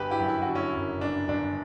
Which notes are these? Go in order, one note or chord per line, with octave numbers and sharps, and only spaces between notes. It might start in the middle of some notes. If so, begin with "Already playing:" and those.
Already playing: G1 G4 B4
E4 G4
F#2
E4
F#4
D3
C#4 E4
F#1
G1 D4
G1 D4